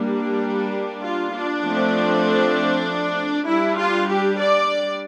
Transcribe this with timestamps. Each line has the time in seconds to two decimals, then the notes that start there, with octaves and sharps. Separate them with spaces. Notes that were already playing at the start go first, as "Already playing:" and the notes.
Already playing: G3 A#3 D4
1.02 F4
1.33 D4
1.64 F3 A3 C4
3.48 G3 D4 E4
3.78 F4
4.09 G4
4.40 D5